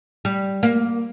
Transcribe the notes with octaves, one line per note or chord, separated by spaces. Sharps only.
G3
A#3